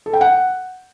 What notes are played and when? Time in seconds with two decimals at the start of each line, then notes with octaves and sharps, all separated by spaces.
0.06 A4
0.13 G5
0.21 F#5